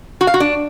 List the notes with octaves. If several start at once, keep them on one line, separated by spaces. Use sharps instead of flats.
F#4
F5
F#4
D4